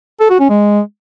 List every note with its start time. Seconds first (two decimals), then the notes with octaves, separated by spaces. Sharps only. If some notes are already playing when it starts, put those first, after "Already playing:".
0.20 A4
0.30 F#4
0.40 C#4
0.49 G#3